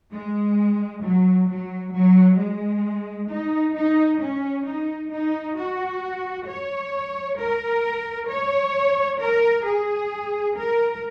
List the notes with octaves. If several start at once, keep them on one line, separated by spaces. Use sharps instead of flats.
G#3
F#3
F#3
F#3
G#3
D#4
D#4
C#4
D#4
D#4
F#4
C#5
A#4
C#5
A#4
G#4
A#4